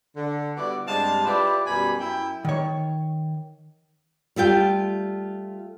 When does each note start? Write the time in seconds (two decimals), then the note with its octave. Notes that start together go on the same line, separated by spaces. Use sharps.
0.16 D3
0.57 G3 B3 E4 F#4 D5
0.87 G2 C3 G#3 D5 F5 A5
1.25 E4 F4 G4 B4 D5
1.67 F#2 B2 G3 G#5 B5
2.00 F#2 E4 E5 G5
2.45 D#3 C#5
4.36 G3 A3 F4 G5